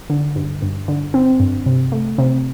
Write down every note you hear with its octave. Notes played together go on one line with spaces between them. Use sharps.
D3
G2
G2
D3
C4
G2
C3
A3
C3